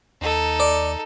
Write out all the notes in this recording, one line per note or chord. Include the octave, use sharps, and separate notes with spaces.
D#2 D#4 A4
D5